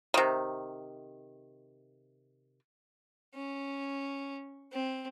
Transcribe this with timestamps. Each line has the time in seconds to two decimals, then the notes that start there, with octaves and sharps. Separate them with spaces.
0.14 C3 D#3
3.35 C#4
4.73 C4